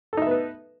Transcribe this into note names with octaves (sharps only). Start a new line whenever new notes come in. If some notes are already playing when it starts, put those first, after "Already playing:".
B3 D#4 A4 B4 E5